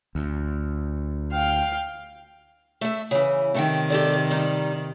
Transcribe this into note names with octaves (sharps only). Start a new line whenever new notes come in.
D2
F5 G5
A3 E5
C#3 E3
C3 D#3 A3 F#5 G5
G4 A4 D5
G3 D#4